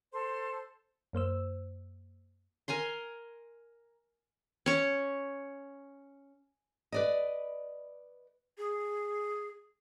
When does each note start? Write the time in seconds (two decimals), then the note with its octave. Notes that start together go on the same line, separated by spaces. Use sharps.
0.13 A4 C5 C6
1.13 F#2 A#3 C5 E6
2.68 A#4 G#5 A#5 C6
4.66 C#4 C#5
6.92 B4 D5 D#5
8.58 G#4